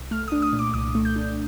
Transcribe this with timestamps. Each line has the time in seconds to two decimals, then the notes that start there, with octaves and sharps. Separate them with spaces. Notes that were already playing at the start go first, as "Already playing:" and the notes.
Already playing: C2
0.11 A3 F6
0.28 D4 D#6
0.42 D#6
0.53 A#2
0.59 D6
0.74 C2 D#6
0.95 A3
1.05 G6
1.16 D4